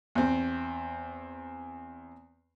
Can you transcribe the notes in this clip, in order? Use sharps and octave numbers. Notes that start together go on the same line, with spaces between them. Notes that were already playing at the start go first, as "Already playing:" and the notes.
E2 C4